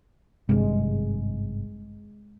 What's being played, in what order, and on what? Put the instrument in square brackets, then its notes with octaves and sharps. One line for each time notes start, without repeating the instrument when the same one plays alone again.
[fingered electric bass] G#1 G2 C3 [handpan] G#3